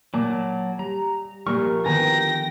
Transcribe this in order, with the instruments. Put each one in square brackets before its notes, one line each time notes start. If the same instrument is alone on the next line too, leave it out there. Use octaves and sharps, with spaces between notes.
[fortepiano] A#2 [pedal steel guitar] F#3 A5 D6
[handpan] G3 [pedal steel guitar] A#5
[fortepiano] A#2 F6 [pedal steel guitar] F3 A#4 C#6 [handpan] G3
[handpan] D3 D#3 B3 [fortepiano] B4 G#5 A#5 [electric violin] G5 A#6